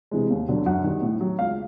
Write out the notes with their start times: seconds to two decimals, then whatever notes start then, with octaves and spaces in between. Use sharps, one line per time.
0.11 C3 E3 G#3
0.30 D#2
0.48 D3 F#3
0.66 F#2 F#5
0.84 D#3 G3
1.02 A2
1.21 F#3
1.39 C#2 F5